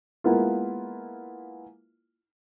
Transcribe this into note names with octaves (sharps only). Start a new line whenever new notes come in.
G#3 A#3 B3 E4 F4